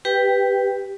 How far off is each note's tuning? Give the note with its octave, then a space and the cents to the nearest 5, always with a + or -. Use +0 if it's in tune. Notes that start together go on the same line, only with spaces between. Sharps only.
G4 +0 B4 +0 G5 +0